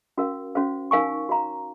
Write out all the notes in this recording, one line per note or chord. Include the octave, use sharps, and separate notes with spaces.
C#4 F#4 A#4 F5
C#4 F#4 C5 F5
D#4 A#4 F5 G#5 C#6
F#4 C#5 F5 A#5